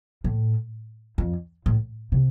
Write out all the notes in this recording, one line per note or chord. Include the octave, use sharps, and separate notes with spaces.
A2
F2
A2
C3